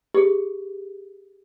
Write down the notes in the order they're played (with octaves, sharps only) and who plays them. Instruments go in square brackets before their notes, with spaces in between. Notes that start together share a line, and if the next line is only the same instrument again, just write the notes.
[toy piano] G4 G#4